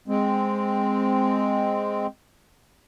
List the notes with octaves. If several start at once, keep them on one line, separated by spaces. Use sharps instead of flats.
G#3 C4